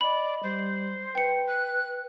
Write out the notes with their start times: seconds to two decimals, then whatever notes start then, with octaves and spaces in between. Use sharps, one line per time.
0.01 D5 D#5 B5
0.43 G3 C5
1.15 B4 G5 C#7
1.48 F#6